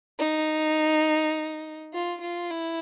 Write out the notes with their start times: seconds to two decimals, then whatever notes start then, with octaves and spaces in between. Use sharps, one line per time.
0.19 D#4
1.93 F4
2.21 F4
2.50 E4